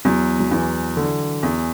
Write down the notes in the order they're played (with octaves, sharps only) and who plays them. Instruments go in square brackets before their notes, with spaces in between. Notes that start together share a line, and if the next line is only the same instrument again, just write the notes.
[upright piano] E2 [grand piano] F#3
[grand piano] F#3
[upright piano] E2 [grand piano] E3
[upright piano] D3
E2